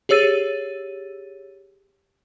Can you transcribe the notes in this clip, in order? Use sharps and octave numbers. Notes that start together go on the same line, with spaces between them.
G4 G#4 C#5 E6 A6 D#7